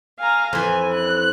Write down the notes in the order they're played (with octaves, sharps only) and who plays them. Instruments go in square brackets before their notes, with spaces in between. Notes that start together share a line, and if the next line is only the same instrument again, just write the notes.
[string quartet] F5 G#5 A#5
[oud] F2 E3 [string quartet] G#5
[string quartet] F#6